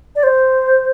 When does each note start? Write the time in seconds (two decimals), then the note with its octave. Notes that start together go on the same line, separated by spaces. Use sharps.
0.16 D5
0.23 C5